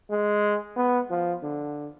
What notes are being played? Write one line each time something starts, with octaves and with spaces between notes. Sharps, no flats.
G#3
B3
F3
D3